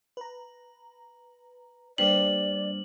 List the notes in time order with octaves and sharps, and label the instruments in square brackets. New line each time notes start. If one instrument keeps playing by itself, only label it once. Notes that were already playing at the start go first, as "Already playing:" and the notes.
[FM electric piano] B4 A#5
[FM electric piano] G3 A#3 D4 [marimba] B4 C5 G5 [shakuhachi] D5 [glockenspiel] F#7